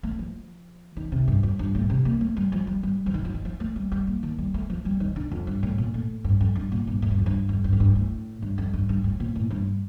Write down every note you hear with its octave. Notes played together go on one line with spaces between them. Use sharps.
A3
F3
D#3
C3
G2
F2
G2
A2
C3
A#3
A3
G3
F3
G3
G3
F3
D#3
F3
D#3
F3
A3
G3
G3
A#3
D#3
G3
A3
F3
G3
D#3
D3
F2
G2
A2
A#2
A2
G2
F2
G2
A#2
G2
A2
G2
F2
G2
F2
G2
F2
G2
A2
G2
F2
G2
G2
A2
A#2
A2
G2